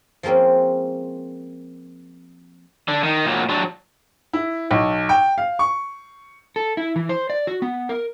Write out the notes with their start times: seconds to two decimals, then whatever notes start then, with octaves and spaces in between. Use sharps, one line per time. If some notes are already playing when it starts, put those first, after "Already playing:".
0.23 F3 G#3 A#3 C4 C#4
2.88 D3 D4
3.03 D#3
3.26 A#2 F#3
3.49 F#3 D4
4.33 E4
4.71 B1
5.09 G5
5.38 F5
5.59 C#6
6.56 A4
6.77 E4
6.96 E3
7.09 C5
7.30 D5
7.47 F#4
7.62 B3
7.89 A#4